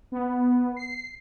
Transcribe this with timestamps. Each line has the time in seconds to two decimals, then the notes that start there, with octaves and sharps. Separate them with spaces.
0.12 B3
0.77 C7